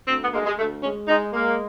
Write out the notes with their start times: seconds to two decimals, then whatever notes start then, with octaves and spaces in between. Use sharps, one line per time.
0.08 D2 C4
0.22 B3
0.33 G#3 A#3
0.46 G#3
0.59 D2 A3
0.83 G#3 C#4
1.08 G#3 D#4
1.33 G#3 A#3